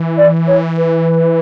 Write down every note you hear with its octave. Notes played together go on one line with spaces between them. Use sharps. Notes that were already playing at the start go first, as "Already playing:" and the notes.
Already playing: E3
D5
C#5
B4